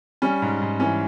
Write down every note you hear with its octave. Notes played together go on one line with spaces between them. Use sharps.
G3 C#4
G#2
G#2
E3 C#4